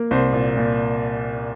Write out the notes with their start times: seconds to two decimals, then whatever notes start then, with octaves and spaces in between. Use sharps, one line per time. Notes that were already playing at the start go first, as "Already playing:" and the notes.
Already playing: A#3
0.11 C2 C5
0.33 A#2
0.57 A#2